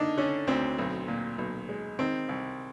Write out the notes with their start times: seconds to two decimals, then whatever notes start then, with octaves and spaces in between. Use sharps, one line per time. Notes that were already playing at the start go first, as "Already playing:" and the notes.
Already playing: D3 A#3 D4 D#4
0.18 D3 C#4
0.47 D2 C4
0.79 B1
1.08 A#2
1.38 B1
1.69 G#3
1.99 D#3 C4
2.29 C2